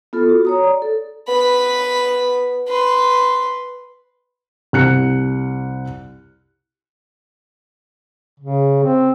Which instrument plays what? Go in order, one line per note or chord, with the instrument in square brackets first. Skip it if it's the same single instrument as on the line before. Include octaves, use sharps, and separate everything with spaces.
[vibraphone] B3 F4 A4
F#4
C#5 A#5 D#6
D5
A4
[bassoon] B3 [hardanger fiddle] B4 B5
[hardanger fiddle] B4 C6
[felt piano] C2 F#6 C#7
[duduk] C#3
C4